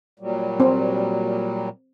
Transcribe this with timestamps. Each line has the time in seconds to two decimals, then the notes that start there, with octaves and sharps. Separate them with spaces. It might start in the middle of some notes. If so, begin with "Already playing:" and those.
0.19 A#2 F#3 G3
0.60 C4